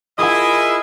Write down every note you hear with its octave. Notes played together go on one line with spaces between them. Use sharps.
E4 F4 G#4 A#4 D#5 E5 G#5 D#6